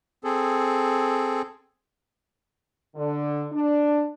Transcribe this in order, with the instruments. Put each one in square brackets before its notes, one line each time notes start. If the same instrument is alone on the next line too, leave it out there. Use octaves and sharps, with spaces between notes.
[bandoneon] C4 G#4 A4
[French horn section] D3
D4